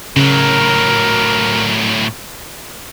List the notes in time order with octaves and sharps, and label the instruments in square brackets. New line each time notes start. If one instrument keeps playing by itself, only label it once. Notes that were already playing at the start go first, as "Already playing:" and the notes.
[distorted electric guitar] A2 F#3 [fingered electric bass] C#3 [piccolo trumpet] A#4